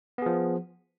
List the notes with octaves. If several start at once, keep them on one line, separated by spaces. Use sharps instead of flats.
F3 B3 G#4